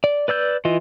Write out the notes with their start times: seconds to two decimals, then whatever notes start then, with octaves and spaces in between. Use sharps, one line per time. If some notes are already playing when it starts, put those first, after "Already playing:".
0.04 D5
0.28 B4 D5 E6 G6
0.65 E3 F4 D#5